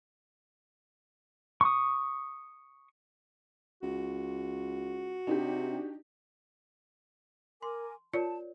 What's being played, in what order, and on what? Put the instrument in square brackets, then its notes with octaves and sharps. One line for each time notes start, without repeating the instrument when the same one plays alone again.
[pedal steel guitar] C#6 D#6
[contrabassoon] C#2 [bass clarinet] F#4
[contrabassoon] C3 [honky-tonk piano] D4 D#4 G4
[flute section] A#4 G#5 D6 [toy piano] C6
[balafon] F4 [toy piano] A#4 C#5 D5 [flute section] A5